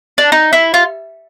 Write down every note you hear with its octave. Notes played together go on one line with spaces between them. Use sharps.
D4
D#4
E4
F4